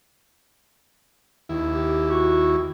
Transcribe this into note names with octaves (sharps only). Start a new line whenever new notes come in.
D#2 E4
G4
F#4